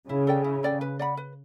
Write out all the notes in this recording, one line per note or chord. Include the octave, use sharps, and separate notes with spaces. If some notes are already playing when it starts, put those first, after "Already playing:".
C#3 E4
A4 D5 G5
E4
A4 D5 G5
B4
D5 F#5 B5
B4